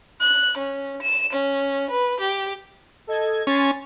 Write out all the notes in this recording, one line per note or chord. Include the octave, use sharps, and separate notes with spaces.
F#6
C#4
E7
C#4
B4
G4
A4 D#5 G#6
C#4 G#5 C6 A6